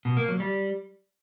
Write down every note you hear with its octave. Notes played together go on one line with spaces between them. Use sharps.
B2
A#3
F#3
G3